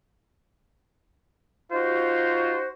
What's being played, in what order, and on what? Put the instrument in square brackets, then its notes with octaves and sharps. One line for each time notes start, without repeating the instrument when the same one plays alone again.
[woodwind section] D#4 F#4 C5 [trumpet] F4